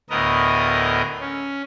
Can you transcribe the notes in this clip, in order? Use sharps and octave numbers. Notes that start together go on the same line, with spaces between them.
D2 A2 B3 A#4 D#5
C#4